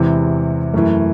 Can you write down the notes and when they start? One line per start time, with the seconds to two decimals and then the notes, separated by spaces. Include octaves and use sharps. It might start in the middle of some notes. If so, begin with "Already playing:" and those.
Already playing: E2 C3 E3 G#3
0.74 F#2 E3 A3